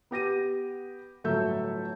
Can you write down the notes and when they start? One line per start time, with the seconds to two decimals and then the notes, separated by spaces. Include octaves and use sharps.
0.11 B3 G4 A#6 D#7
1.24 G1 A2 F#3 A4 E5 G6